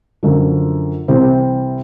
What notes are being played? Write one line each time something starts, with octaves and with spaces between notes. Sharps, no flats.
F#2 D3 F3
C2 C3 E3 G3 C4